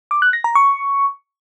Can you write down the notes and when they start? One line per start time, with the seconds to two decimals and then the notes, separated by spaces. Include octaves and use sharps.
0.11 D6
0.22 F#6
0.33 A#6
0.44 A#5
0.55 C#6